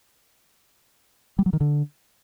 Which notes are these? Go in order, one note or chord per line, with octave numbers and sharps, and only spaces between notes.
G3
F#3
D#3
D3